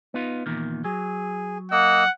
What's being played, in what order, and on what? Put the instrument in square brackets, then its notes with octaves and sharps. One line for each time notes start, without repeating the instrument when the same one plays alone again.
[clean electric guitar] B3 D#4 F4
E2 A#2 D#3
[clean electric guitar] F#3 [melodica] G#4
[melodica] A#3 D#5 E6 [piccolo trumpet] F#5